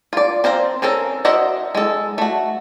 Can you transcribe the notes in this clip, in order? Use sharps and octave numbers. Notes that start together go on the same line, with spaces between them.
F4 D5
C4 C5 F5 A#5
C4 C#4 A4 A#4
F#4 A#4 C5 D#5 E5
G#3 A4
A3 F#4